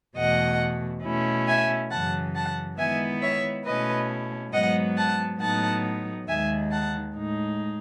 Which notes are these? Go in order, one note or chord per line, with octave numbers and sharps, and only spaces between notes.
E2 B2 A3 D#5 F#5
B2 A3 C#4 E4
E5 G#5
F#2 C#3 E3 F#5 A5
F#5 A5
D#3 G#3 B3 E4 E5 G#5
C#5 E5
B2 A3 C#4 E4 B4 D#5
G#2 F#3 B3 D#5 F#5
F#5 A5
A2 F#3 B3 D#4 F#5 A5
D#2 D#3 G#3 E5 G#5
F#5 A5
A2 G#3 D#4